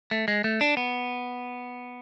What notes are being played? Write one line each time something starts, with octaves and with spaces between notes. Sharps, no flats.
A3
G#3
A3
D4
B3